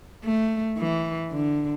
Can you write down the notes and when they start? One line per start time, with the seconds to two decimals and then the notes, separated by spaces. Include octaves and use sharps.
0.24 A3
0.78 E3
1.31 D3